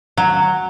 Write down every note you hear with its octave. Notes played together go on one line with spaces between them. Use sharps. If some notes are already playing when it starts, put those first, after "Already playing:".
F#3